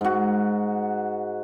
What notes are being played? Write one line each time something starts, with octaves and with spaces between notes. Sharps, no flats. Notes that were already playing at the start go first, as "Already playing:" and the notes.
G#2 F#4